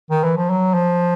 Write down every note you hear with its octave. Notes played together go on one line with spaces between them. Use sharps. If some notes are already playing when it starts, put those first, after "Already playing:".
D#3
E3
F3
F#3
F3